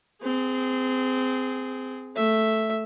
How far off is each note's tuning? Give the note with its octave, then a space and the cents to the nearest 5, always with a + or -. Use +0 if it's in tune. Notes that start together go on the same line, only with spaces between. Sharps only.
C4 -25 G#4 +0
A3 +0 E5 +0